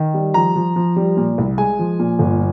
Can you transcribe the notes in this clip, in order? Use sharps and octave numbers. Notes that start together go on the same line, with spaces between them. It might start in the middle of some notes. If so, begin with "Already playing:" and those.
Already playing: D#3
G3
F3 A#5
F3
F3
G3
A#2
C2
G#3 G#5
F3
A#2
G1